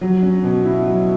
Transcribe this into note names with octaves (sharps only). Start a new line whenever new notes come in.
F#3
C#4
B2
E4
F#3